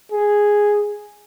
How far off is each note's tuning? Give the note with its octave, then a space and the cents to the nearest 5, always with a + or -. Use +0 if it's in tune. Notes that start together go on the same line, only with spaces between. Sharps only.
G#4 -5